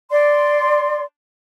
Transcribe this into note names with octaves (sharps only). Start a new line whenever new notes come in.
D5 C6